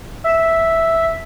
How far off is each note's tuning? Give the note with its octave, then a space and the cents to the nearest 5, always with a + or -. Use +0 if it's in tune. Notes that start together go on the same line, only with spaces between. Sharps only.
E5 -5